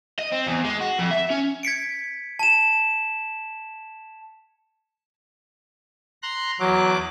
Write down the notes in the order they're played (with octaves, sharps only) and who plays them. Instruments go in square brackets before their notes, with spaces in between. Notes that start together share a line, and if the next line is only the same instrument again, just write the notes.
[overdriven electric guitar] D#5
C4
E2
G#3
F#4
F2
E5
C#4
[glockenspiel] G#6 B6 C#7 D7
A5 E7
[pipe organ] A#5 C6 F#6
[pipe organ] E2 D6 F#6 [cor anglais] F#3